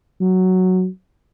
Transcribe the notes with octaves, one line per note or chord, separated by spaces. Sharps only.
F#3